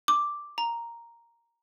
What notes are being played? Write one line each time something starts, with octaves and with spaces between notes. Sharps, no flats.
D6
A#5